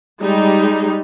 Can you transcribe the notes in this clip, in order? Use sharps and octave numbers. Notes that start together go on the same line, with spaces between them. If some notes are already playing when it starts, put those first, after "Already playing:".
G3 G#3 D#4